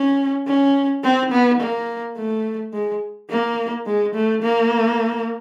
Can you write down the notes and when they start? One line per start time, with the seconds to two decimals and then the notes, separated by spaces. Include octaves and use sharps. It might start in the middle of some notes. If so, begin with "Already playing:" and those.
Already playing: C#4
0.47 C#4
1.03 C4
1.31 B3
1.60 A#3
2.17 A3
2.73 G#3
3.30 A#3
3.86 G#3
4.15 A3
4.42 A#3